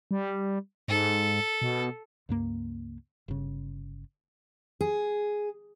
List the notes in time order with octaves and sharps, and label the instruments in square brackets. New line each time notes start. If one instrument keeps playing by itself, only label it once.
[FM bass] G3
[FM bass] G#2 [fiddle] A4
[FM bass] B2
[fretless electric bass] C#2 G2 A#3
G1 C#3
[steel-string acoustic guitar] G#4